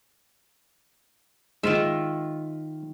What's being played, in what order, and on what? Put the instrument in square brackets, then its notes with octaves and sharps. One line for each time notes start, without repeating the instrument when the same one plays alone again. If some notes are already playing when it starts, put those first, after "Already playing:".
[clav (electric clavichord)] G#2 G#3 [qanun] D#3 F4 E5